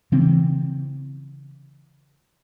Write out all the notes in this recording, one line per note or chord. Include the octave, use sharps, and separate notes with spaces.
C#3 E3 C4